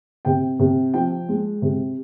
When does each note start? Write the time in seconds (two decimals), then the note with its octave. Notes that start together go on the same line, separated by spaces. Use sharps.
0.25 C3 G5
0.59 C3
0.94 F3 G5
1.29 G#3
1.62 C3